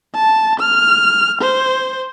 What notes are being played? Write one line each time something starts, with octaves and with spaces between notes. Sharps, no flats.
A5
F6
C5